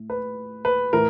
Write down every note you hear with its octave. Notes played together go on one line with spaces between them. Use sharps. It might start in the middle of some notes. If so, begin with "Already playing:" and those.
Already playing: A2
B4
B4
A2 E3 A#4